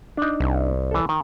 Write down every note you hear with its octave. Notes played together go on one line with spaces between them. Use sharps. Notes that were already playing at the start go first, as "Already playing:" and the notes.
D4 D#4
C2
E3 A4
D#3